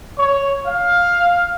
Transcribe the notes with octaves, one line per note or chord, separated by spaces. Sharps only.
C#5
F5